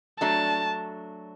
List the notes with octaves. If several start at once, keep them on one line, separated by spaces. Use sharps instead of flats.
F#3 A3 D4 A5